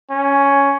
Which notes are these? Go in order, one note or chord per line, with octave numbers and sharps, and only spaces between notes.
C#4